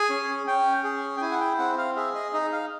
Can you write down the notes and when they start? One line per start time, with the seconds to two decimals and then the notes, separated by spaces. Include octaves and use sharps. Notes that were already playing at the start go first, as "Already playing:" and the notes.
Already playing: G#4 G#5
0.10 C#4
0.47 C#4 G5
0.84 G#4
1.17 G5
1.21 E4 G#5
1.31 F#5
1.40 G5
1.58 C4 F#5
1.78 F5
1.96 G#4 E5
2.15 D#5
2.33 D#4 D#5
2.52 F5